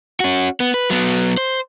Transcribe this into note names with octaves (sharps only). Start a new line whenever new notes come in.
C#4 F#4
B3
B4
F#3 B3
C5